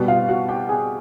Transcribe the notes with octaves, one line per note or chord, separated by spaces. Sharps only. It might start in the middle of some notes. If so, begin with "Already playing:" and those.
Already playing: B2 G3 B3
F4 F5
F#4 F#5
G4 G5
G#4 G#5